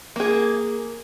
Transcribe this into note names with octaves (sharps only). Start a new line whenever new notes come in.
A#3 G#4